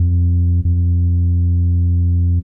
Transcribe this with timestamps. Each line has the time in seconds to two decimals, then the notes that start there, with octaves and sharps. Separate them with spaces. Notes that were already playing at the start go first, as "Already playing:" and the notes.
Already playing: F2
0.65 F2